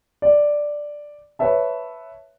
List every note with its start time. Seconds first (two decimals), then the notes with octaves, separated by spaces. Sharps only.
0.22 D5
1.39 B4 C#5 E5 A5